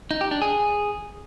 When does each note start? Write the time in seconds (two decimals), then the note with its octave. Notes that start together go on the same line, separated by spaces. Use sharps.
0.11 D#4
0.21 G4
0.31 D4
0.42 G#4